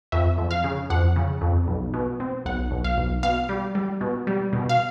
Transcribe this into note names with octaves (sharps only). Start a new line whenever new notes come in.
F2 E5
F2
F5
C#3
F2 F#5
C#3
F2
B1
B2
C4
B1 F#5
B1
F5
B1
B2 F5
G3
G3
B2
G3
B2
F5